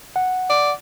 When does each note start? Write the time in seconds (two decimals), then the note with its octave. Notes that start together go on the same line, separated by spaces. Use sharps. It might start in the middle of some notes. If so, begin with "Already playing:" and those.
0.16 F#5
0.50 D5